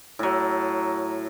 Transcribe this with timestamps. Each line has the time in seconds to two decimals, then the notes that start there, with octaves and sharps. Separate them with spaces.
0.19 A2 F#3